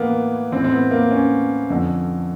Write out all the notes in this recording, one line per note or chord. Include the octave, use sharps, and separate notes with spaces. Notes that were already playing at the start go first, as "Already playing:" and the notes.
Already playing: A2 E3 A#3 B3
A2 E3 C4
C4
B3
A#3
C#4
F2 D3